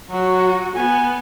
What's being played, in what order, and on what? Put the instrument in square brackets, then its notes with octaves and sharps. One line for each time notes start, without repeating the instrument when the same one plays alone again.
[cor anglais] F#3 [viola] F#4
[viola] B3 [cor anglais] G#5